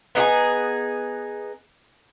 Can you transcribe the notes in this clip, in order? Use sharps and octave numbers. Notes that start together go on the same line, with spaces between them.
B3 D#4 G4 G#4